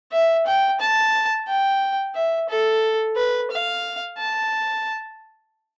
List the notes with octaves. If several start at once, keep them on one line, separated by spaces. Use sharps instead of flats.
E5
G5
A5
G5
E5
A4
B4
F5
A5